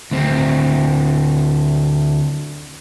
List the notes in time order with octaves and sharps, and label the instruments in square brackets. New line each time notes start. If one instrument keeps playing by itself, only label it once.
[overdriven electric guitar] D2 C4